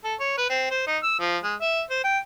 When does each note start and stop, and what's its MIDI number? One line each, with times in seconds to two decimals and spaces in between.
0.04 0.15 69
0.20 0.37 73
0.38 0.48 71
0.50 0.66 60
0.70 0.83 72
0.87 0.98 63
1.03 1.19 88
1.20 1.38 53
1.44 1.55 56
1.61 1.82 76
1.90 2.00 72
2.04 2.18 79